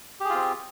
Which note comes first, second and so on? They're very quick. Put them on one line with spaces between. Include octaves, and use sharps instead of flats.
G4 G#4 F4 C4